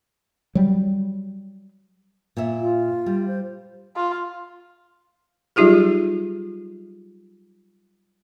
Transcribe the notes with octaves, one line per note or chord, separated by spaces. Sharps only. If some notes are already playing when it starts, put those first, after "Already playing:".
F#3 G3
A#2 C#5 E5
F4
G3
C5
F4
F#3 G3 D#4 F4 G4 G#4